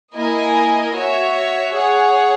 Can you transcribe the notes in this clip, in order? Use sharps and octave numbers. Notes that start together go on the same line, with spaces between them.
A#3 E4 A#4 D#5 G#5
F#4 C#5 E5
G#4 C#5 F#5